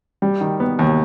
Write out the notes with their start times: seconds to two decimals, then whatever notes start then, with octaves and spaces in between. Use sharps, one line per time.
0.22 G3
0.41 D#3
0.60 B3
0.79 D#2